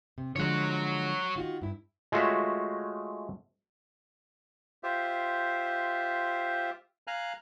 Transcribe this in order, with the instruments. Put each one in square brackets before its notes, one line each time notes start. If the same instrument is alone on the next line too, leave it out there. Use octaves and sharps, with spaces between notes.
[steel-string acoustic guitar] C3
[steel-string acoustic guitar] D3 F3 G#3 [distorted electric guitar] C#5 F#5
[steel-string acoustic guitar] D#3 F4 F#4
G2 E4
[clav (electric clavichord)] G#3 A3 F4 F#4 C#5 E5
[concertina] F4 G4 C5 E5
F5 G#5 A#5 F6 F#6